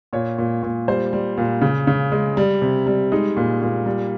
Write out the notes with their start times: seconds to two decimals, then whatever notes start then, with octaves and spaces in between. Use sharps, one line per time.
0.13 A#2 C#5
0.38 A#2
0.63 A#2
0.88 G3 C5
1.13 G3
1.37 A#2
1.62 C#3
1.87 C#3
2.12 G#3
2.37 G3
2.62 C3
2.87 G3
3.12 G#3 D#4
3.37 A#2
3.62 A#2
3.86 G3